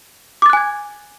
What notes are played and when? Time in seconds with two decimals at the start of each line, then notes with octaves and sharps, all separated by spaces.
0.42 D6
0.46 A6
0.50 F#6
0.53 G#5
0.57 G#6